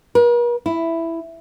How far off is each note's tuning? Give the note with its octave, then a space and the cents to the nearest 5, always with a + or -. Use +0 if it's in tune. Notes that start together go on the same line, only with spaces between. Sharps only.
A#4 +45
E4 +5